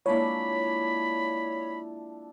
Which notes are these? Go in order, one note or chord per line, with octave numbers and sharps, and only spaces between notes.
F3 G#3 A#3 D4 E4 C#5 B5